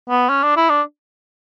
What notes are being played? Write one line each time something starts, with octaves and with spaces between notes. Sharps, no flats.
B3
C#4
D4
E4
D4